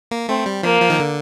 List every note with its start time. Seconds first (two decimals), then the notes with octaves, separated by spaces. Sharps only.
0.11 A#3
0.29 A3 C4
0.46 G3
0.63 F3 A#3
0.82 F3
0.90 D#3
1.00 D3